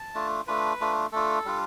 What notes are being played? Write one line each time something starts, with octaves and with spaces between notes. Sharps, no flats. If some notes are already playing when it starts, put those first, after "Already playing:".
Already playing: A5
A3 D4 F4
A3 D4 F4 B4
A3 D4 F4
A3 D4 F4 A4
G3 D4 F4